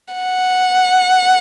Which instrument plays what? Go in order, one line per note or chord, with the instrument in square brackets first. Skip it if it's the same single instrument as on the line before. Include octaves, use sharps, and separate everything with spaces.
[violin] F#5